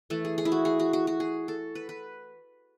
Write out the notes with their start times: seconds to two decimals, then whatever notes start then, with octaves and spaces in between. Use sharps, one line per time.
0.10 E3 A3 A4
0.25 G#4
0.38 G#4
0.45 E4
0.52 F#4
0.65 G#4
0.80 F#4
0.93 F#4
1.07 F#4
1.20 G#4
1.48 A4
1.75 B4
1.89 B4